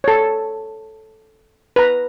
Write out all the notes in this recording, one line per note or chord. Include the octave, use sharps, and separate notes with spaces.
A4 C#5
B4 A#5